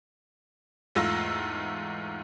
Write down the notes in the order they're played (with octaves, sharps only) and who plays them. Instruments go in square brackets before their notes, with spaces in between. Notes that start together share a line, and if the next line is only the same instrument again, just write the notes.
[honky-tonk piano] E2 G#2 A3 F4 E6 A#6